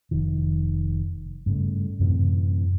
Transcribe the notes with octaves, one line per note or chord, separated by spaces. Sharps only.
F1 D#3
G2 C#3 A3
F#2 A2 C3 E3